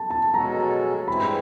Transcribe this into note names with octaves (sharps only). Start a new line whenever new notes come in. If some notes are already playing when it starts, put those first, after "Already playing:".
Already playing: A5
A5
B2 G#3 C#4 F#4 A4 A#5
G2 E3 G#3 C4 E4 B5